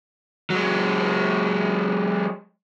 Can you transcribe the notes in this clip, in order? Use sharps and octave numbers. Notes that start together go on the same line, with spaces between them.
F#3 G#3